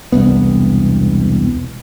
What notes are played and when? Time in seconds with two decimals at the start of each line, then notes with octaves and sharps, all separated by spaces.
0.12 E1 C2 B3